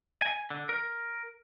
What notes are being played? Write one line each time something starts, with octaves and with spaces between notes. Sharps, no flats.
G#5
D3
A#4